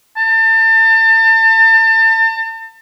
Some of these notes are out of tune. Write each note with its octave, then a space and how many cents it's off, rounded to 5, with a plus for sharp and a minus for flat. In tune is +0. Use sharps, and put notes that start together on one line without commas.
A5 +35